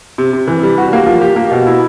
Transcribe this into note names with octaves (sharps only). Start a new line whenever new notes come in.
C3
C3
E3
G3
F#4
A#3
F3
G4
A#3
B2
E4